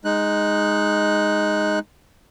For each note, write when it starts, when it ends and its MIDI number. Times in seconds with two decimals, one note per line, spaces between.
0.05 1.79 56
0.05 1.79 63
0.05 1.79 90